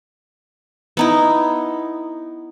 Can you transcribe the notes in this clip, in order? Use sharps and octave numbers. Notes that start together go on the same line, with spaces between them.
B3 D#4 E4